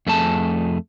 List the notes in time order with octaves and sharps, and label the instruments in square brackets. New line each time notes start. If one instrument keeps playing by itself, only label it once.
[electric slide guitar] F2 A3 G#4 A5